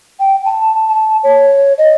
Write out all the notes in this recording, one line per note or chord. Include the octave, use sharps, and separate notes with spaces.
G5
A5
A5
C#5
D#5